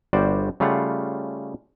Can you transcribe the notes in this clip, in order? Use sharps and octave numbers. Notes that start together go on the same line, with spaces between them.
G1 G3 F#4 C5 D5
C#3 G3 A3 F4 F5 F#5